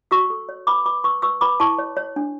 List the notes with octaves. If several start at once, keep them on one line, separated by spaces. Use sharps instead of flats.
F#4 C#6 E6
A4
C#5
B4 B5 D6
B4 B5 D6
B4 C#6 E6
B4 C#6 E6
B4 B5 D6
E4 A5 C#6
C#5
C#5
D4